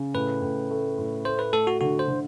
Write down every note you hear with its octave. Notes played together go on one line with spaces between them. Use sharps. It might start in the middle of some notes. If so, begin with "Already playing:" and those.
Already playing: C#3
A2 B4
A2
A3
A2
A3 C5
B4
A3 A4
F#4
D3 F#4
C5
D3